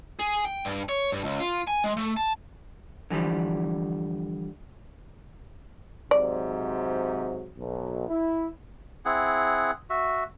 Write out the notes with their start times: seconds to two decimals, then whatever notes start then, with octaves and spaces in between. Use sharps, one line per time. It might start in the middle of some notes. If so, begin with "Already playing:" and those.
0.19 G#4
0.45 G5
0.65 G2
0.89 C#5
1.12 G2
1.24 C#2
1.40 F4
1.67 G#5
1.84 G#3
1.97 A3
2.17 A5
3.10 D3 E3 F3 G3
6.11 G#2 C3 F#3 D5
7.57 B1
8.09 E4
9.05 C4 E4 G#4 F#5
9.90 F#4 E5